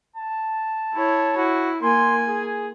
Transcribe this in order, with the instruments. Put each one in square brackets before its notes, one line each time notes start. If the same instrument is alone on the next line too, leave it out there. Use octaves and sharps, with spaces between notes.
[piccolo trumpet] A5
[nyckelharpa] E4 C#5
[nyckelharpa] E4 [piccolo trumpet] F#4
[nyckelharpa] A#3 G#5 [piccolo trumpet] C6
[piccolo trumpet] G#4